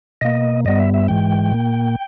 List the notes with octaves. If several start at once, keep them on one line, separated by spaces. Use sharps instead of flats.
B2 A#3 D#5
G2 G3 B3 D#5
E5
E5
G#2 E3 G#3 G5
A#2 A#3